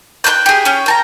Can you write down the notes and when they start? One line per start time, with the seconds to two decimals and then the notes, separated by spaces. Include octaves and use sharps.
0.24 G5 B5 F#6 G6
0.46 G4 G#4
0.65 C#4 G5
0.86 G5 A5 A#5